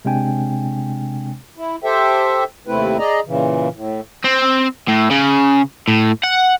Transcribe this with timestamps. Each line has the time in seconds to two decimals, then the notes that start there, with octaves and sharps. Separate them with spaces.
0.05 C3 G#3 C4 D4 G5 G#5
1.57 E4
1.84 G4 A4 C5 E5 G5
2.67 D#2 C3 A3 C4 E4 B4
2.99 G#4 D5 D#5 A#5
3.26 A#2 C#3 E3
3.74 A2
4.24 C4
4.88 A2
5.11 C#3
5.88 A2
6.24 F#5